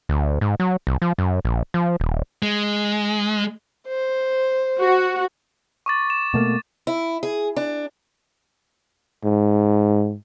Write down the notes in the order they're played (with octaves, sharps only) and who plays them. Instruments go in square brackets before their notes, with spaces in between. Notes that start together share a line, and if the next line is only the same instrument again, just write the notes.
[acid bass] D2
G#2
F#3
C2
F3
F#2
A#1
F3
D#1
[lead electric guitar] G#3
[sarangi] C5
[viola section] F#4
[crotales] C#6 D6 A6
E7
[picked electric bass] B2 A3 A#3
[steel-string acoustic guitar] E4
G#4
D4
[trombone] G#2